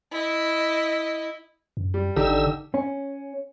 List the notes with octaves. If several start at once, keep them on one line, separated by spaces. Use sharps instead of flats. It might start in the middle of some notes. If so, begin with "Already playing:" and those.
E4 D#5
F#2
G3
G#1 D3 D#4 G4 E6
C#4